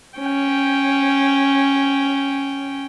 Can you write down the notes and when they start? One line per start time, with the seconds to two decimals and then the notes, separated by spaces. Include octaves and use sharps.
0.18 C#4 G5